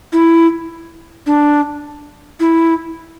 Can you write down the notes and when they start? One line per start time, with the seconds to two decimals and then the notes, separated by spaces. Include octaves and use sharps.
0.13 E4
1.26 D4
2.40 E4